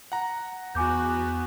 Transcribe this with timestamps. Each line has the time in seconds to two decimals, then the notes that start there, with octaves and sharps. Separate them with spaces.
0.12 F#5 A#5
0.75 E2 B3 F#4 G#5 D6 G6